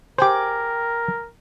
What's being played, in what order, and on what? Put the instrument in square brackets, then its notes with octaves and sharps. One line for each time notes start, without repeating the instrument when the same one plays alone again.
[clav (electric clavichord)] G4 C5 [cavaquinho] G#4 G5 D6 [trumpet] A#4